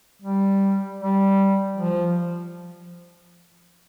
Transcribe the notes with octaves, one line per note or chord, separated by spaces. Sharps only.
G3
G3
F3